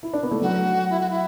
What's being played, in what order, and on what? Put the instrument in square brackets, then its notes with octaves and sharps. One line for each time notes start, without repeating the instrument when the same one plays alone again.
[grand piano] E4
D4
B3
A3
[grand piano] F#3 [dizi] F#4
[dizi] E4
F#4
E4